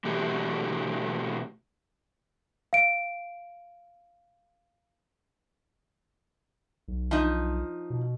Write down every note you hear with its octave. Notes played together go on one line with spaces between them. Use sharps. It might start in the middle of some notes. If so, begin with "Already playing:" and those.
B2 E3 A3 F#4 G4
F5 D7
B1
F3 D#4
B2